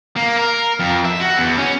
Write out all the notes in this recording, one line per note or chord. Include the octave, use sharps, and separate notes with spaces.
A#3
A#4
F2
E5
F#4
E2
C#4